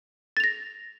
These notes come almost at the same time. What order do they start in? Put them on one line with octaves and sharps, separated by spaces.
A6 F7 A#6